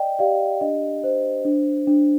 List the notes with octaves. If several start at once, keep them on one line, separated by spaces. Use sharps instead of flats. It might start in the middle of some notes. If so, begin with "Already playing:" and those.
Already playing: D5 D#5 G5
G4 D5 F5
D4 D#5
C5
D4
D4